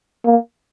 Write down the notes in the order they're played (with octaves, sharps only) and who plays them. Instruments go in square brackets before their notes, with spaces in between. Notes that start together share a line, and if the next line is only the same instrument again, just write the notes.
[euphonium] A#3